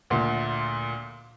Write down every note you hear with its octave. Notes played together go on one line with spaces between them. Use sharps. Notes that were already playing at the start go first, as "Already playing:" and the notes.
D2 A#2